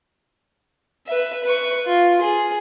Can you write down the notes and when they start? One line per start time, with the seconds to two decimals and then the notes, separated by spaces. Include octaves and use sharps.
1.07 B4 E5
1.44 B4 C#6
1.86 F4
2.21 G#4